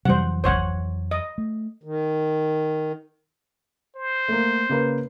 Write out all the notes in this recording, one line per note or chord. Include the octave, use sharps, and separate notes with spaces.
F2 C3 E3 F#3 G3 C5 F#5
G#1 C#2 C5 C#5 F#5
D#5
A3
D#3
C5
A3 A#3
C#3 A#3 B4